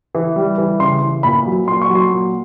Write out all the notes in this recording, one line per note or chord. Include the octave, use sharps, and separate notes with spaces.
E3
G3
E3
C#3 C6
E3
A#2 B5
F#3
A#2 C6
C#6
F#3
C6
A#2